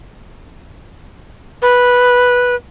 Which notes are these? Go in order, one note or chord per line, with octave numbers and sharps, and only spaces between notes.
B4